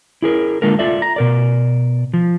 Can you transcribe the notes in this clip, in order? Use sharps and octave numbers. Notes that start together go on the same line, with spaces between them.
E4 G#4 A#4
D3 G#3 A#3 F4 A4 A#4
F4 A4 D5 E5
A#5
B2 A#4 D5
F3